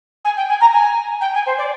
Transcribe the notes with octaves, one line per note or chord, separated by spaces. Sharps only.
G#5
G5
G#5
A#5
G#5
G5
G#5
C5
D5